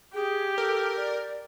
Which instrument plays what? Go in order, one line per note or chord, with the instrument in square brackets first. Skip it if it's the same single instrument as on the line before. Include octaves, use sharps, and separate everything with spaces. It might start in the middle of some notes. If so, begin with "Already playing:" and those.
[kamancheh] G4 [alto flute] G#4
[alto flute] A4 [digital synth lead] A#4
[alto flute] D5